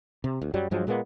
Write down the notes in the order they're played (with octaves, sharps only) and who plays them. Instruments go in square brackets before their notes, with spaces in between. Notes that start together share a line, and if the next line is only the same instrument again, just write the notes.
[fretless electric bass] C3
D2
F#2 F#3 G3
G2 F3 F#3 G#3
A#2 G#3 A#3 B3